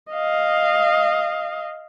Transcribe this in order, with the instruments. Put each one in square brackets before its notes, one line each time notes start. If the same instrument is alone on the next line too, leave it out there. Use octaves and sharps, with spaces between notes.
[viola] D#5 F5